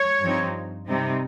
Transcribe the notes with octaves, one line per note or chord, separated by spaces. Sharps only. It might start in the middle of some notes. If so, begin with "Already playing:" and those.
Already playing: C#5
G2 F3 C4 D#4
C3 G3 C4 D#4